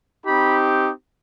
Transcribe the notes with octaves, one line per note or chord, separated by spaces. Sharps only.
C4 D#4 G4 B5